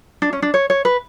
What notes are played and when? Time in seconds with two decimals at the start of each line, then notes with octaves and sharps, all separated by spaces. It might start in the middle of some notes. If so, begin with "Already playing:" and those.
0.22 D4
0.33 C#4
0.42 D4
0.54 C#5
0.70 C#5
0.85 B4